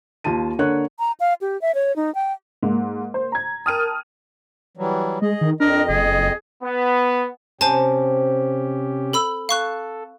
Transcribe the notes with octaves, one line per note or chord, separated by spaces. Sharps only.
D#2 F4 A5 D#7
D3 A#3 D4 C#5 F#6
A#5
F5
G4
E5
C#5
D#4
G5
G#2 A#3
C5
A#5 G#6
A#4 G5 A5 D#6 F6 D#7
E3 F#3 G3
G#3 G#4 D#5
D#3
F2 D4 A#4 D#5
F#1 G#4
B3
C3 C4 C#4 G4 C5 G#5 A5
A4 B5 E6
A4 F5 C#6 F#6